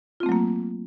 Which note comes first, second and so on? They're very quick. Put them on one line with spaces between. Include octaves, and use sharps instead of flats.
F4 C4 A3 F#3 A#3